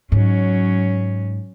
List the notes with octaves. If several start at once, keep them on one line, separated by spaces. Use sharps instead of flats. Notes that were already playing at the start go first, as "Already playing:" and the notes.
G#2 F#3 C#4